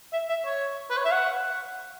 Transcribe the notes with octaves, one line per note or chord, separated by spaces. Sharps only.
E5
E5
C#5
B4
C#5
E5
F#5